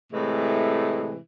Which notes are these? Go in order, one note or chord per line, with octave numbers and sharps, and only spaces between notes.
A2 C3 E3 G#3 A3